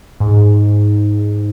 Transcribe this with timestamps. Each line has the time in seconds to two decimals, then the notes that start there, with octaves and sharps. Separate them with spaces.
0.20 G#2